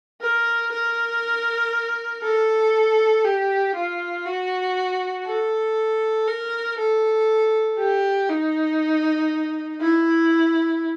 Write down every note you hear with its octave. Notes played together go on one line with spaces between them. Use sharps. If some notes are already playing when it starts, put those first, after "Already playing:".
A#4
A#4
A4
G4
F4
F#4
A4
A#4
A4
G4
D#4
E4